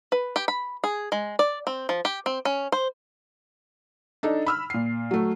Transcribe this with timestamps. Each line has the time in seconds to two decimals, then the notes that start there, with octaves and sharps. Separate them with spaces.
0.12 B4
0.36 G4
0.48 B5
0.84 G#4
1.12 G#3
1.39 D5
1.67 C4
1.89 F3
2.05 G4
2.26 C4
2.45 C#4
2.72 C5
4.23 D4 D#4 A4
4.46 B5 E6 F6
4.70 A#2 C7
5.11 F#3 A3